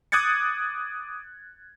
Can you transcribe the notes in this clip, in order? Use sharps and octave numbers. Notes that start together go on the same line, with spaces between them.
D6 D#6 F#6 G#6 A6 C#7